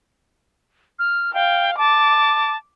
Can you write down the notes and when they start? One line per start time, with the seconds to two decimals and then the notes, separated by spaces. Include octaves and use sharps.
0.99 F6
1.34 F5 G5
1.78 A5 D6